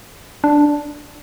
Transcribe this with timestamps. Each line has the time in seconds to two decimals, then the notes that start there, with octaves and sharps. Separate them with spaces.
0.44 D4